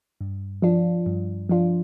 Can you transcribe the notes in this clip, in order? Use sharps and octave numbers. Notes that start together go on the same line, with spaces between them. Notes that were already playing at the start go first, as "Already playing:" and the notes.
G2
F3 D4 F4
G2
F3 D4 F4